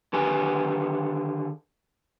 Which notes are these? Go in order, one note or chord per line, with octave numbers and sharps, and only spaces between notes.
D3 D#3 G4 G#4 B4 G#5